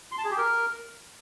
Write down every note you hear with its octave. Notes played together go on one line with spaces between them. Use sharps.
C6
A5
G#4
G4
A#4